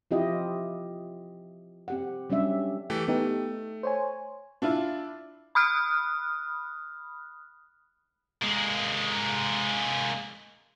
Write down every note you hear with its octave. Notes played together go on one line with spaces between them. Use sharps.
F3 C4 E4 F4 G4 D#5
C4 G4 F#5
F#3 G3 C#4 D4 E5
E3 A3 G4
A3 B3 D#4 G4
C5 C#5 G#5
D4 E4 F4
B5 D#6 F6 F#6
G#3 A#3